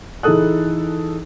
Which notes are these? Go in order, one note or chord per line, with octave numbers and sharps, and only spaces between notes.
E3 D#4 G#4 A4 D#6 F#6